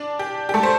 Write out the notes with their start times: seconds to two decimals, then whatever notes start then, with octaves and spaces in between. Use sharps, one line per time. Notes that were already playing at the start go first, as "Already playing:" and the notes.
Already playing: D4 D5
0.19 G4
0.49 G4
0.54 A3 A4
0.63 C5